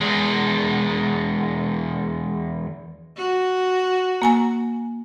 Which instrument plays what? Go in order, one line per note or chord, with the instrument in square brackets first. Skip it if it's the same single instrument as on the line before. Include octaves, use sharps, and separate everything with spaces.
[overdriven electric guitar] E2 G#3
[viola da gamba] F#4
[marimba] A#3 G#5 A#5